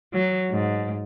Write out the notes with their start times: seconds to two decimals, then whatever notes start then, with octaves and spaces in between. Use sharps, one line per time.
0.13 F#3
0.51 G#2